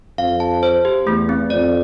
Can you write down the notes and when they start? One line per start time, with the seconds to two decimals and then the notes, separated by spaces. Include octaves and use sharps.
0.18 F2 F5
0.40 A5
0.63 C5
0.85 G4
1.06 E2 A3
1.29 C4
1.50 F2 D5